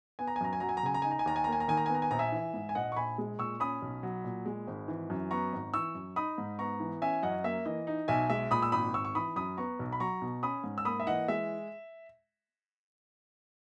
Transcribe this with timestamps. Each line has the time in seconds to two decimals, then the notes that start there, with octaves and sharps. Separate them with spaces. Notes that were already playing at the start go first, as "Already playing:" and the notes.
0.19 B3 G#5
0.27 A#5
0.36 G#5
0.41 F#2 A#5
0.53 G#5
0.60 F#3 A#5
0.69 G#5
0.77 A#5
0.83 C#3 G#5
0.94 A#5
1.02 D#4 G#5
1.11 A#5
1.19 G#5
1.26 D#2 A#5
1.36 G#5
1.44 A#3 A#5
1.52 G#5
1.60 A#5
1.68 D#3 G#5
1.77 A#5
1.86 G#5
1.90 B3 A#5
2.02 G#5
2.11 A#1 A#5
2.19 E5 G#5
2.32 E3
2.54 G#2
2.69 G#5
2.75 A#1 D#5 F#5
2.92 C#6
2.96 A#1 G#5 B5
3.18 G#3
3.39 A#2 C#6 E6
3.60 C#4 B5 D#6
3.82 B1
4.03 F#3
4.24 A#2
4.46 G#3
4.67 G#1
4.88 E3
5.10 F#2
5.31 B3 A#5 C#6
5.52 G#1
5.74 E3 C#6 E6
5.95 F#2
6.16 D#4 B5 D#6
6.38 G#2
6.59 B3 A#5 C#6
6.80 E3
7.02 C#4 E5 G#5
7.23 F#2 D#5 F#5
7.44 A#3 E5
7.65 E3 D#5
7.87 D#4
8.08 B1 E5 G#5
8.30 G#3 E5
8.51 A#2 B5 D#6
8.62 E6
8.72 G#1 B5 D#6
8.94 G#1 C#6 E6
9.05 C#6
9.15 E3 B5 D#6
9.36 F#2 B5 D#6
9.57 B3 A#5 C#6
9.79 B1
9.92 B5
10.00 F#3 A#5 C#6
10.22 B2
10.43 C#4 B5 D#6
10.64 G#2
10.78 E6
10.85 A#3 B5 D#6
11.00 E5
11.07 E3 D#5 F#5
11.28 G#3 E5